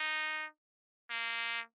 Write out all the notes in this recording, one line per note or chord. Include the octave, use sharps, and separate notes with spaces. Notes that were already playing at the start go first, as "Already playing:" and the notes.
Already playing: D#4
A#3